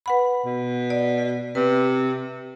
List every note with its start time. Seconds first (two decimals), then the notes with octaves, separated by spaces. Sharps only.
0.06 B4 F#5 B5
0.45 B2
0.90 D5
1.55 C3 B4